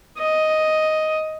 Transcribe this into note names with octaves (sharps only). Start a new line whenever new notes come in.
D#5